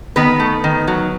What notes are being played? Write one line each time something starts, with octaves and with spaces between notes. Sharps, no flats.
D#3 B3 B4
A3
D#3
F#3